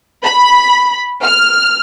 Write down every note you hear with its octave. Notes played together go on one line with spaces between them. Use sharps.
B5
F6